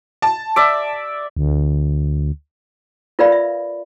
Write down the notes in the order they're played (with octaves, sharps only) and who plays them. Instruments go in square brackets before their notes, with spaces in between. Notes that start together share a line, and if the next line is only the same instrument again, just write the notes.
[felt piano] A5
[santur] D5 E5 D6
[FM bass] D2
[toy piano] F4 A#4 B4 D5 F5 B5
E5